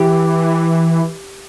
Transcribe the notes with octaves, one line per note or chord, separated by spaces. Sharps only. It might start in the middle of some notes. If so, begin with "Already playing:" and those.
Already playing: E3 G4